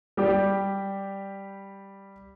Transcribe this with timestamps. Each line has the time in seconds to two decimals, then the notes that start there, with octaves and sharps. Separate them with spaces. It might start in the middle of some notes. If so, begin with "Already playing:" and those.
0.17 G3 G4